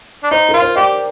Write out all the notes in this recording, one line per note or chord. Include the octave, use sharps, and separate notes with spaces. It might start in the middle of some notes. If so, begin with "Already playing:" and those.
D4
D#4 C5
A#4
F4
C5
G4 D5